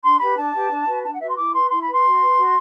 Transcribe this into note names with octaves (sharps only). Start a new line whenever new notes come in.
D4 C6
G4 B4 B5
D4 A5
G4 B4
D4
F#4 B4
D4 A5
F#5
F#4 B4 E5
C6
E4 D6
B4 C6
E4 C6
B5
B4
C6
F#4
B4
F#4